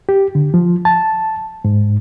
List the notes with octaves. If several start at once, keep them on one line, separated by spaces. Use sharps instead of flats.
G4
D3
F3
A5
G#2